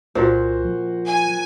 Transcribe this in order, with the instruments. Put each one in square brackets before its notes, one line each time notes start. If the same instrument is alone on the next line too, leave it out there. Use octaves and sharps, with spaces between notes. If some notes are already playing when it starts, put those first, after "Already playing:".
[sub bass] C2 [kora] A#2 [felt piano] F#4 C5
[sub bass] F3
[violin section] G#5